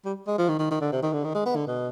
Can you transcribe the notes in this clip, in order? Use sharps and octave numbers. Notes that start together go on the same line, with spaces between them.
G3
G#3
F3
D#3
D#3
D#3
D3
C3
D#3
D3
D#3
G#3
B3
D3
B2